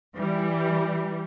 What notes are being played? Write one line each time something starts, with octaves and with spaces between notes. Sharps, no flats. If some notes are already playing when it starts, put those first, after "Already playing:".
E3 G3